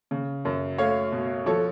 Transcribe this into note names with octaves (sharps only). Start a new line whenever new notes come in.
C#3
F#2
A3 C#5 F5
B2
F3 A4 C#5